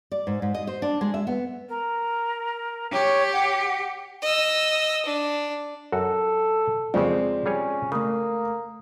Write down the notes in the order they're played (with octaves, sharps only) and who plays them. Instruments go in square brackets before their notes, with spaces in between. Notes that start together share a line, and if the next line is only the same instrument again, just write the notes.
[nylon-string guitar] D5
G#2
G#2
D#5
C5
D4
G#3
E5
B3
[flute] A#4
[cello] G4 [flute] C#5
[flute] F#5
[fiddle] D#5 E6
D4
[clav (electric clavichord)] F#2 F#4 F#5 [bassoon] A4
[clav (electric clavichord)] F2 C#3 [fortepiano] F3 G#3 C4 [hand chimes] D5
[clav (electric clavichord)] G3 G#4 C#5 [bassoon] C#4
[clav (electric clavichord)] C#3 [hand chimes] A3 D#6 [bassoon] A#3